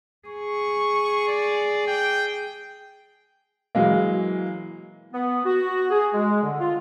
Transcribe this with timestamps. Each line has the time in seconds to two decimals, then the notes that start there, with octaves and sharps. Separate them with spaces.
0.28 G#4 C#6
1.27 D5
1.87 G5
3.75 E3 F#3 G#3 A#3
5.14 B3
5.46 F#4
5.91 G#4
6.14 G#3
6.42 D3
6.60 F4